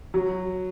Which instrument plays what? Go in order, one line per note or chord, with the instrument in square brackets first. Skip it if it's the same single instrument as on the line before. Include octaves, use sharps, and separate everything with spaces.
[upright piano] F#3